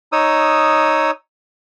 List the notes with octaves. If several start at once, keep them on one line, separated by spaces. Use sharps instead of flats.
D#4 C#5 D#6 E6